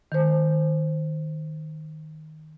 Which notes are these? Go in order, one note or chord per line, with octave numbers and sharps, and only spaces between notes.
D#3 C5